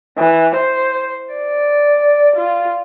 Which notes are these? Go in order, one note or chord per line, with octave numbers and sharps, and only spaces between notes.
E3
C5
D5
F4